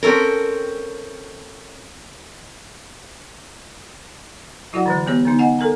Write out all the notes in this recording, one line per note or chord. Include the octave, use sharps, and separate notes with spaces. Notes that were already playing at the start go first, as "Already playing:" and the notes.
C4 C#4 A4 A#4
F#3 E4 F#4 D5 F#5
D3 E3 G#3
G#3 B3 G4 C#5
D3 B3 D#4
D#5 F#5 G#5
A4 A#4 G#5 A#5